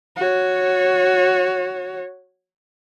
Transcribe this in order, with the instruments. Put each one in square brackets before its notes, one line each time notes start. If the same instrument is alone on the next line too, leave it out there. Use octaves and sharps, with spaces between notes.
[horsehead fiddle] F#4 C#5